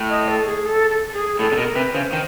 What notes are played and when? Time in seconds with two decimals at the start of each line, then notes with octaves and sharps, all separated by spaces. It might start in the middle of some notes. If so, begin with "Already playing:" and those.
Already playing: A2
0.10 D#5
0.28 A4
0.46 G#4
0.65 A4
0.90 A4
1.08 A4
1.14 G#4
1.39 A2 A4
1.52 C3
1.57 B2 A#4
1.76 C3 B4
1.94 C#3 C5
2.13 D#3